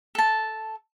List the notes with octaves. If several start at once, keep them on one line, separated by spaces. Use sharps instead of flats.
A4 A5